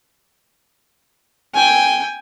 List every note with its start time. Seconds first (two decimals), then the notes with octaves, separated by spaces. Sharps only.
1.54 G5 G#5